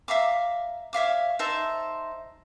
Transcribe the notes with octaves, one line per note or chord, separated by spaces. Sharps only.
E5 F5 A#5 D6
C#5 E5 F5 D6
D#4 C5 E5 A5